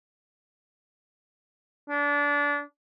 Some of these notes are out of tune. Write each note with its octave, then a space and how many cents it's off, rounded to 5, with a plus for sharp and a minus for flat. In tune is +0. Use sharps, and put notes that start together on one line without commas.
D4 -25